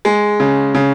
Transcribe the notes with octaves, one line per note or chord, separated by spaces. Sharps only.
G#3
C#3
C#3